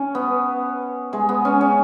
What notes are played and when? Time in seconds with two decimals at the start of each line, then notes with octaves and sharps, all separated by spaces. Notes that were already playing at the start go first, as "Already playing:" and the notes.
Already playing: C#4
0.15 B3
1.13 G#3
1.29 B3
1.45 C#4
1.61 C#4